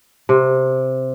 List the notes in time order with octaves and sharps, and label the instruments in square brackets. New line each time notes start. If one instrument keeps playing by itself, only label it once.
[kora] C3